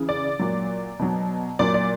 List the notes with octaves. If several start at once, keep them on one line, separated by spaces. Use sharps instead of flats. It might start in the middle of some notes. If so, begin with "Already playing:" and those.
Already playing: C#3 E3
D5
A#2 F#3
B2 F#3
A#2 F#3 D5
D5